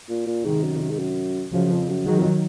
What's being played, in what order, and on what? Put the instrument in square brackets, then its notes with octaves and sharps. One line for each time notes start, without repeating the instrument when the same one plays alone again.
[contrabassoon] A#2
A#2
[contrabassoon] G#2 [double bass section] C3 D#3
[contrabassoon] F#2
F2
F#2
G#2
F#2
[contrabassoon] F#2 [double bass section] C#3 F3
[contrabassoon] F2
F#2
[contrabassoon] G#2 [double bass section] D#3 F#3
[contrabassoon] F2